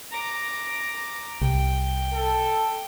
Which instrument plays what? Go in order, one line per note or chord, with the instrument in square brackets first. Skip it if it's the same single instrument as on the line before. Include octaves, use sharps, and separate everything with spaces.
[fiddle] A#5 D6
[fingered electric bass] C2 [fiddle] G5
[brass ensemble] A4